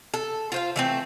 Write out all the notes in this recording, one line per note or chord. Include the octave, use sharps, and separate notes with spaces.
A4
F4 C5 F5
E3 A3 C4